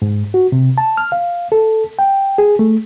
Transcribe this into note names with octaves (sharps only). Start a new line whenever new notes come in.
G#2
F#4
C3
A5
F6
F5
A4
G5
G#4
A3